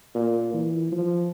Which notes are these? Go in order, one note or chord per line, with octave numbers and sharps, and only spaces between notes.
A#2
E3
F3